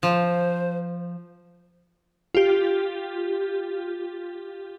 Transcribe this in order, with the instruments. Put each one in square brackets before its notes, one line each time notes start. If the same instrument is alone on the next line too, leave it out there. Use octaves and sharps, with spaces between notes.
[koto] F3 [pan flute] C5
[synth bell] F4 G4